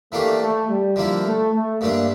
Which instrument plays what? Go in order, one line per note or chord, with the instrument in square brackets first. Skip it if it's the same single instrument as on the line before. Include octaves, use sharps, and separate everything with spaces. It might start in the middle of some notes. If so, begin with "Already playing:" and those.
[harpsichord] E3 A#3 D4 G4 [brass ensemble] A3
[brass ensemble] A3
G3
[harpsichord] D3 G3 A#3 E4 [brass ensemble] F3
[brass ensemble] A3
A3
[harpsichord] G2 D3 A3 D4 [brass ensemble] A#3